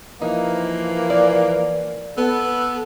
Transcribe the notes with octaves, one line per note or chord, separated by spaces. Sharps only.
E3 F3 A#3 D#4
D5
B3 A4